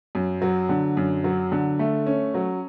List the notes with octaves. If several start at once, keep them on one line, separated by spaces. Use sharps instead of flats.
F#2
F#3
D3
F#2
F#3
D3
A3
C#4
F#3